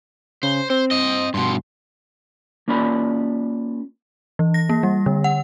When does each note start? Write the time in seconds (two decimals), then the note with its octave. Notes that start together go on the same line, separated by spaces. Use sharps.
0.43 C#3 C5
0.70 C4 C5
0.91 C5 D#5
1.34 G2 B2 C6
2.68 A#3 C#4 F4 D5 B5
4.39 E3
4.54 A#6
4.69 A#3
4.83 G3
5.06 D3
5.24 F#5